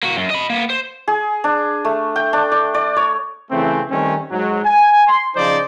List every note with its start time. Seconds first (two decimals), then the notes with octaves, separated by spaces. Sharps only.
0.03 A#3 F#4
0.17 F#2
0.30 D#5 B5
0.50 A#3 B3
0.70 C5
1.08 G#4
1.44 D4
1.85 A3
2.16 G5
2.33 D4
2.52 D5
2.74 D5
2.97 C#5
3.51 C#3 E3 A3 C4
3.91 D#3 G3 A3 C4 C#4
4.31 G#2 F#3
4.65 G#5
5.07 C6
5.36 C#3 F3 D#4 C5 D5